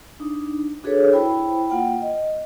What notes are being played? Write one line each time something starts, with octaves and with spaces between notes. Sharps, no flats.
D4 D#4
D4 F#4 G#4 A4 B4 C#5
E4 C5 G5 B5
A#3 F4 F#5 G5
D#5